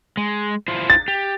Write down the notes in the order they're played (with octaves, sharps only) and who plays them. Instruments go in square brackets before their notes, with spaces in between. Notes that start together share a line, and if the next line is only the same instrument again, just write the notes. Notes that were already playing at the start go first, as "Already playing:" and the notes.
[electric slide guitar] G#3
E4 F4 C5
[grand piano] A6
[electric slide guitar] G4